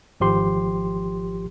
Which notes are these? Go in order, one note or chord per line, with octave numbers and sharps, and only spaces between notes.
G#1 F3 G4 C6